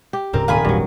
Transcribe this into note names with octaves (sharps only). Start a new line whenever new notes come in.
G4
D1 G#2 C#3 C4 A#4 D6
D#1 C4 F4 G#5 B5 D#6
G#1 E2 G2 A#2 F#3